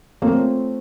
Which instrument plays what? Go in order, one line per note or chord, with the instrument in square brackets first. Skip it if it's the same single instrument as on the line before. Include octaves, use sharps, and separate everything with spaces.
[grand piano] A3 C4 F4 A4 C#5 [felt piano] A#3